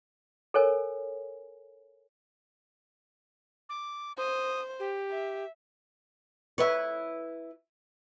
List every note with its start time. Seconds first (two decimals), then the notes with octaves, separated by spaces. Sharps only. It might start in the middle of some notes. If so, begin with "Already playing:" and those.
0.54 A4 A#4 C#5 G#5
3.69 D6
4.18 C5 D#6
4.80 G4
5.11 E5
6.58 E4 B4 C#5